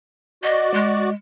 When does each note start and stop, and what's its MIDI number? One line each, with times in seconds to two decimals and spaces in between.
0.43 1.10 66
0.43 1.10 74
0.43 0.71 75
0.74 1.13 56